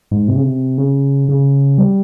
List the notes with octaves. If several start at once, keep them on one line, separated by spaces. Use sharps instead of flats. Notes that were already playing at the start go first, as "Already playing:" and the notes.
G#2
C3
C#3
C3
C#3
C#3
G3